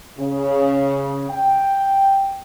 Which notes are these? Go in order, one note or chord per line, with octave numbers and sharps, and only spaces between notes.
C#3
G5